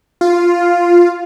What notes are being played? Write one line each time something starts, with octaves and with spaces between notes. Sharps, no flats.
F4